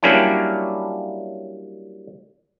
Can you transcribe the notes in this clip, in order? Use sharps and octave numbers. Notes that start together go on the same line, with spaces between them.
F#3 G3 A#3 C#4 D4 E4